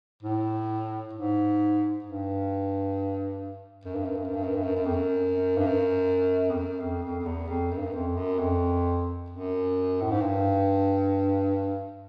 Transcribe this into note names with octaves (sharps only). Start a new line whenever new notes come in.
A2
G#2
G2
F#2
G2
F#2
G2
F#2
G2
F#2
G2
F#2
F#2
F2
F#2
G2
F#2
F2
F#2
F2
F2
F2
E2
F2
F#2
G2
F#2
F2
F#2
F2
F#2
A2
G#2
G2